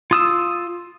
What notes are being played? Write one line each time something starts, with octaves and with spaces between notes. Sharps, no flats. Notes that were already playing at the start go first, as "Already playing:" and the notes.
F4 D#6 E6